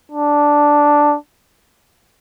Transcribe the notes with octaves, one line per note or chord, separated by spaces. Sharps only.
D4